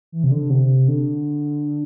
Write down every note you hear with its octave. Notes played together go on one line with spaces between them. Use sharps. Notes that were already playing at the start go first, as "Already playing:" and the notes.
E3
C3
D3
C3
D3